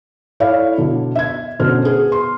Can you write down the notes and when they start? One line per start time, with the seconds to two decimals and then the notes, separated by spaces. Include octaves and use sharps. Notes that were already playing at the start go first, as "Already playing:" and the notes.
0.40 E4 A4 C#5 D5 E5 F5
0.78 B2 D3
1.15 E5 G#6
1.59 B2 D3 C#4 C5 F6
1.84 B3 G#4
2.12 C6